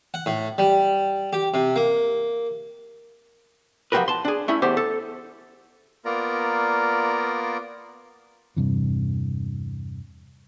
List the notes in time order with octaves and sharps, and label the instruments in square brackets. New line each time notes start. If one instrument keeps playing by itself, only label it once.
[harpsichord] F#5
A2
G3
G4
C3
A#3
[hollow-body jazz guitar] F3 F#3 G#3 G4 A#4 B4
A5 C6
D4 G#4
A3 C#4 E4
E2 A3 G4 C5
A4
[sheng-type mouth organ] A#3 B3 F4 A#4 D5 A#5
[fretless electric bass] E2 G2 C3 E3